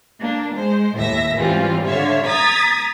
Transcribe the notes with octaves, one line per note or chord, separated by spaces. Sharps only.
A#3 D4
G#3 C5
D#2 A2 E5 A#6
G#2 E3 G3 C4 C#4 F4
D3 C#5 E5 F5
A#5 D#6 G#6 A6 B6